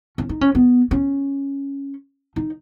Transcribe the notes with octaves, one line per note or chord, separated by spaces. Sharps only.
C#4
D#4
C#4
B3
C#4
D#4